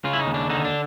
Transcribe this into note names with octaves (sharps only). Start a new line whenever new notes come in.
C#3 F4
E4
D#4
D#2
D4
D3 D#4
D4